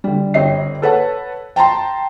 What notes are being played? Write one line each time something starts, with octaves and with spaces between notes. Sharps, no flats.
D3 G3
G1 C4 G4 C#5 D#5 C7
A4 B4 C#5 F#5 A5
G5 A5 A#5 C6